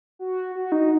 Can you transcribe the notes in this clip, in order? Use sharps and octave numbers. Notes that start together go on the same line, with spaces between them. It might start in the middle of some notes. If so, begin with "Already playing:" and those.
F#4
F#4
D#4